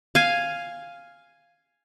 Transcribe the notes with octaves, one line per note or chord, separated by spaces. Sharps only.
F5 G#5